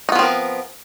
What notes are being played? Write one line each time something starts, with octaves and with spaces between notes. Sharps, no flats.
F3 B3 C4 D#4 A#4